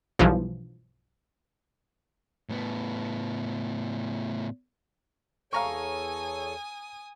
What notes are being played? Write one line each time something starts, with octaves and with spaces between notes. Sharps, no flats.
B1 G2 E3 F3
A2 B3
E2 A4 C#5 F5 G#5 A#5 C#6 D#6